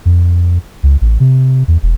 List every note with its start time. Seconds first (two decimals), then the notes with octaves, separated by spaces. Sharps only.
0.05 F2
0.83 C#2
1.01 A1
1.20 C3
1.68 E2
1.83 E1